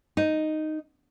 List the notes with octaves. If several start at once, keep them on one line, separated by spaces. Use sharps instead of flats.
D#4